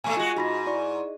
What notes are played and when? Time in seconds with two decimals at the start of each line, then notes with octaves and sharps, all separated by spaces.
0.04 A#2 A3 A4 G#5 C#6
0.17 G#3 F4 F#4
0.36 G#2 F#4 B5 A#6
0.67 E4 D5 C#6